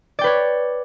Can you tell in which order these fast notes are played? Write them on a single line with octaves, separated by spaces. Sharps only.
D5 G5 B4 C#5